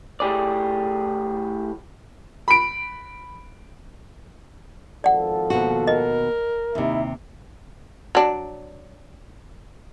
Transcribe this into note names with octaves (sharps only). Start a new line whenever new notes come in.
A2 G4 G#4 D5
B5 D7
G#1 F3 A4 D5 F#5
D#2 B2 F#4
A#4 D#5
D#2 C3 D#4 E4
F#3 D4